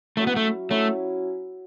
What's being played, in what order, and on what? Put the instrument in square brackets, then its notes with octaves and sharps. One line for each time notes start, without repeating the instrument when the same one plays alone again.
[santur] F#3 C#4 E4 [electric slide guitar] A3
[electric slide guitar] B3
A3
[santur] F#3 C#4 E4 [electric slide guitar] A3